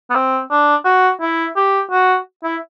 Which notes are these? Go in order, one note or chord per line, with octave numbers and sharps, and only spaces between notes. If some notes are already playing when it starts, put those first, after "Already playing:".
B3
C4
D4
F#4
E4
G4
F#4
E4